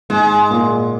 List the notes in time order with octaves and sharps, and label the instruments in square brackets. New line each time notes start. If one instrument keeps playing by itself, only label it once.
[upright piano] G#2 [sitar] G#3
[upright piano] A#2